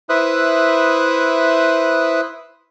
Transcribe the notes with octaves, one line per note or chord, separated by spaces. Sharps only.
E4 B4 C5 E5 D#6 F#6